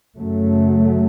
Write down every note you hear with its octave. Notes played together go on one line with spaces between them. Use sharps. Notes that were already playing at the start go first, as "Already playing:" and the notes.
F#2 C#3 F#3 A3